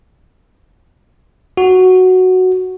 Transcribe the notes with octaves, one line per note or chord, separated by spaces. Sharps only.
F#4